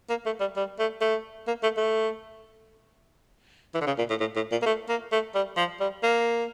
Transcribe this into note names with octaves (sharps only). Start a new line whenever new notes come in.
A#3
A3
G3
G3
A3
A3
A#3
A3
A3
E3
D3
C#3
A#2
A2
A2
A2
A#2
A#3
A3
A#3
A3
G3
F3
G3
A#3